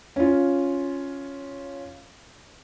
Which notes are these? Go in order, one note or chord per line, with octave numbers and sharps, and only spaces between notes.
C#4 F4